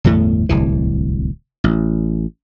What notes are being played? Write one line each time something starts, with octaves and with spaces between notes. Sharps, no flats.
G1 E2 A2 A3
D1 C2 E3
A1